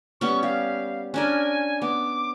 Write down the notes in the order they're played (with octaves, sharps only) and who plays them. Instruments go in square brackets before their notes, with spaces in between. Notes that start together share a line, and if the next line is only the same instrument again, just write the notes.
[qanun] G3 B3 C#4 [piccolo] C#6
[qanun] G4 [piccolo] F5
[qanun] C#4 D4 A#4 [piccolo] G#5
[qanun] B3 [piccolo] D6